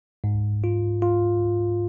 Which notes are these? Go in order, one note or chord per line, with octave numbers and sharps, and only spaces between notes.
G#2
F4
F4